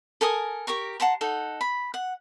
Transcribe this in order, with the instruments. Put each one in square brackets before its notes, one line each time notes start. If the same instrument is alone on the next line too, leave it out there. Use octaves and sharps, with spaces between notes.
[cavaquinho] A4 A#4 G#5 D#6
G4 A#4 A#5 C#6
F#5 A5 A#5 C6
D#4 A4 F#5
B5
F#5